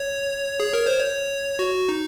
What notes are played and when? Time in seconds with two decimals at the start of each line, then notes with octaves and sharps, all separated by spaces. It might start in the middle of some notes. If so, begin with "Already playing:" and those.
Already playing: C#5
0.60 G#4
0.73 A#4
0.86 C5
1.00 C#5
1.59 F#4
1.89 D#4